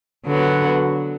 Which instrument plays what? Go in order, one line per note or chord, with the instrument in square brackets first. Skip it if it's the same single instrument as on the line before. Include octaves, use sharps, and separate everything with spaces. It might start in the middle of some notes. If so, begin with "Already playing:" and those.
[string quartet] D3 F#3 B3 F#4